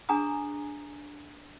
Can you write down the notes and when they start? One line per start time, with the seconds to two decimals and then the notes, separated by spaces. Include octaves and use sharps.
0.09 D4 G#4 G#5 A#5 D#6